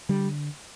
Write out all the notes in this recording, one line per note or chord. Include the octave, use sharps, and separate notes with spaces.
D3 G3